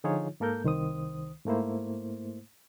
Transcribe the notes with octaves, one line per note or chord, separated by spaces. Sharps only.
D3 F3 D#4 F4 G#4 C#5
G#2 A#3 A4 A#4 G6
C2 D#3 C5 D#6
G#2 A3 A#3 E4 C5